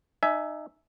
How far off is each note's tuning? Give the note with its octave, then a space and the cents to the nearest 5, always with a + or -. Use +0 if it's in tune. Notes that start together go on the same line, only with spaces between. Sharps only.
D#4 -30 E5 +0 G#5 +20